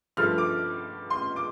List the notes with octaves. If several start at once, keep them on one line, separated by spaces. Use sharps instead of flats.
G2 F3 A3 F6
D6
C6
D6